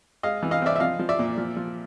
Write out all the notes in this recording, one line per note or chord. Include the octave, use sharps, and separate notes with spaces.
G#3 D#5 F5
E3
D#5 F5
C4 D5 E5
E5
F3 D#5 F5
F3
D5 E5
A#2
F3
F3